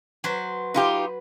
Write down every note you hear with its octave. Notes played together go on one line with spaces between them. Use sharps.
F#3 B4 C5
D#4 F4 G4 B4